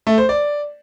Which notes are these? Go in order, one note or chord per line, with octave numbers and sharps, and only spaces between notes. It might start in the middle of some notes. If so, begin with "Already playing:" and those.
A3
C5
D5